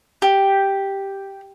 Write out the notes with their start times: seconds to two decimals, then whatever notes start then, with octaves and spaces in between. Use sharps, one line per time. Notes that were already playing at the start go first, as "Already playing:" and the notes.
0.22 G4